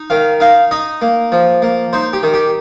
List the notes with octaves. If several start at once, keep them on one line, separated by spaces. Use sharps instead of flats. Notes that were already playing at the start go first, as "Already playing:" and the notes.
Already playing: D#4
D#3 F5
D#4 F5
D#4 D#5
A#3
F3
A#3
D#4 C5
G4
D#3
G4